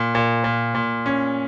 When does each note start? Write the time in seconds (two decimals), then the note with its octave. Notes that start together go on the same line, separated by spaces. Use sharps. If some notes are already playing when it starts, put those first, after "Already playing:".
Already playing: A#2
0.15 A#2
0.44 A#2
0.75 A#2
1.06 C#4